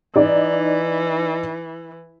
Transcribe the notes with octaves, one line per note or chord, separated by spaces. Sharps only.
E3 D#4 D5